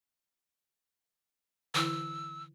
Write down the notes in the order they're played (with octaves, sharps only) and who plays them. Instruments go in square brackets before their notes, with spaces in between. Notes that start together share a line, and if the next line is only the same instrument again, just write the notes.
[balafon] D3 E3 E4 [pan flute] E6